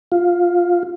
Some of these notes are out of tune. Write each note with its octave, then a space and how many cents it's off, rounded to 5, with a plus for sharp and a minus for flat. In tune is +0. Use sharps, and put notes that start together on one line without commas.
F4 +5